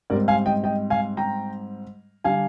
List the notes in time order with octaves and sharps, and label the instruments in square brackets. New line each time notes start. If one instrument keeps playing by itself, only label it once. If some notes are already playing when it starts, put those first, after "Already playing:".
[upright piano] G#2 G3 C4 A#4 D5
F5 G#5
D#5 G5
D#5 G5
F5 G#5
G5 A#5
D3 G3 D4 F5 G#5